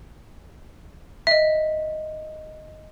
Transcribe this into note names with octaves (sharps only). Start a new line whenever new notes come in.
D#5 E5